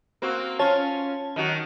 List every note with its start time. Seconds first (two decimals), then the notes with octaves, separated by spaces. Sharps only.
0.22 A#3 C4 F#4
0.59 C#4 F4 C#5 A5
1.36 D#3 F#3 F#4